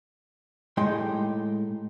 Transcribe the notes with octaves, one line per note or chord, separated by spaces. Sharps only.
A2 G#3 D#4 G4 G5 C6